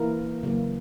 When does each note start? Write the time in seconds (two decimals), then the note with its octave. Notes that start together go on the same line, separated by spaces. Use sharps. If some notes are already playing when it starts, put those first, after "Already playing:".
Already playing: E3 A#3 E4 A#4
0.43 C#3 F#3 A#3